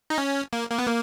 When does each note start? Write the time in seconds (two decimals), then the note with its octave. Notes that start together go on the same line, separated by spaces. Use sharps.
0.10 D#4
0.18 C#4
0.53 A#3
0.70 A#3
0.79 B3
0.87 A#3